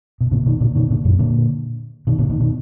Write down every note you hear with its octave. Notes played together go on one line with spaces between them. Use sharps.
B2
A#2 D3
B2 D#3
A#2 D3
B2 D#3
A#2 D3
F#2 A#2
A#2 D3
B2 D#3
A#2 D3
B2 D#3
B2 D#3